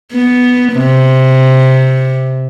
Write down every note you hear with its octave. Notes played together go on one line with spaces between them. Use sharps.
B3
C3